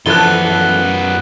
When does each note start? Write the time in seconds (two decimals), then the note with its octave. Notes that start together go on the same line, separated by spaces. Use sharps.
0.06 F#2 E3 F3 B3 A4 F#6 G7